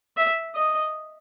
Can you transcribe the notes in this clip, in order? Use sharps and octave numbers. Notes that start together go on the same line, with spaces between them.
E5
D#5